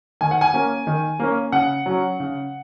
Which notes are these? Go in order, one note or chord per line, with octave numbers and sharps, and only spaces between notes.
D#3 G#5
F#5
G#5
A#3 C#4
D#3
A#3 C#4
C#3 F#5
F#3 C#4
C#3